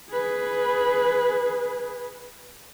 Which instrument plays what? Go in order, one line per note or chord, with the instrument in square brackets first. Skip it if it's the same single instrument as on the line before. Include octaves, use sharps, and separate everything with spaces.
[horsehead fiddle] G#4 B4